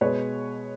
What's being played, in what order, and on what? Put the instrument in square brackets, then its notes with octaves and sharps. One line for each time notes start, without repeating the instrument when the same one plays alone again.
[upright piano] B2 G#3 B4 C#5